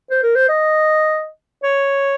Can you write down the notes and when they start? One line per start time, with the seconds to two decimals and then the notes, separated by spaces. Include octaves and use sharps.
0.11 C5
0.23 A#4
0.35 C5
0.49 D#5
1.63 C#5